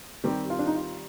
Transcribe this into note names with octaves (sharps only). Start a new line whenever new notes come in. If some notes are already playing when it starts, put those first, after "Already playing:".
D#3 G3 C4 G4
F4
D4
D#4
F4